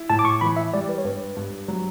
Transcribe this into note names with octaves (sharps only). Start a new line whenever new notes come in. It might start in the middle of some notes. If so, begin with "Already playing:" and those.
Already playing: E4
A2 A5
D6
C#6
E3 B5
E5
G3 D5
B4
C#5
G2 B4
G2
F#3